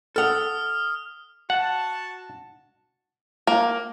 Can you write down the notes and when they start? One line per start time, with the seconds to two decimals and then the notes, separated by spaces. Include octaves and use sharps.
0.16 A4 F#5 D#6 F6
1.50 F#4 F#5 A5
3.47 A#3